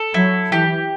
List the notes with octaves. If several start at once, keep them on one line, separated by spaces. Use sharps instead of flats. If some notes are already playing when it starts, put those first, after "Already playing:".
Already playing: A4
F#3 E4
E3 G4